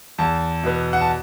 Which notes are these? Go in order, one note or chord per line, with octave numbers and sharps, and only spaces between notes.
E2 A5
B2 B3
F#5
A5